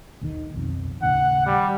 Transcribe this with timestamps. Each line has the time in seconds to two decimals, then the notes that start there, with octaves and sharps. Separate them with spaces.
0.21 A#1 D#2 D#3
0.54 B1 F2 C3
1.02 D#2 A2 C#3 F#5
1.46 G3